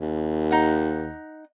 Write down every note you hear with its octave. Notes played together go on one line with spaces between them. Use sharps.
D#2
D#4 F#5